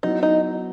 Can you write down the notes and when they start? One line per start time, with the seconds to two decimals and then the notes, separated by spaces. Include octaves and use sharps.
0.03 F#3 B3 D#4 E4
0.23 D#4